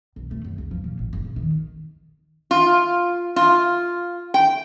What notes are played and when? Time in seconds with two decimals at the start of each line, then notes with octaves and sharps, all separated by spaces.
0.16 B1
0.31 A3
0.45 F#2
0.58 C#2
0.71 F3
0.84 A#2
0.99 A1
1.13 F#1
1.25 A#1
1.36 D#3
2.51 F4
3.36 F4
4.34 G5